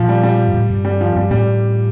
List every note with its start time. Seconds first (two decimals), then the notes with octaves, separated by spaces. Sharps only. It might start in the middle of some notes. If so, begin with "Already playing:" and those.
Already playing: A#2 F3
0.09 G3
0.23 G3
0.48 G2
0.54 A2
0.70 G2
0.85 G3
1.01 F3
1.16 G2 G3
1.31 A2 G3